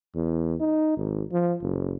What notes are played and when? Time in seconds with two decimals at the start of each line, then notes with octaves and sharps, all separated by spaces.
0.15 E2
0.60 D#4
0.96 G#1
1.32 F3
1.61 F#1